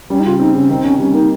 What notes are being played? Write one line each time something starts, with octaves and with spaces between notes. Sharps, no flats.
G3 C#4
D#4
C#3 F4
C4 D#4
C#3 C#4
D#3 C4
C3 C#4
G3 C#4
A#3 D#4